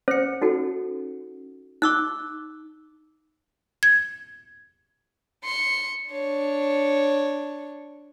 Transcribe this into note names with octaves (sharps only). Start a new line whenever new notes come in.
C#4 C5 C#7
D#4 F#4 A4
D#4 D6 E6 F#6
G#6
C6 C#7
D4 C#5